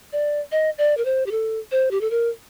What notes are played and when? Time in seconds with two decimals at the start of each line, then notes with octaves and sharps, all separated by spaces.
0.13 D5
0.52 D#5
0.78 D5
0.97 A#4
1.05 C5
1.26 G4
1.31 A4
1.71 C5
1.91 G4
2.01 A4
2.11 A#4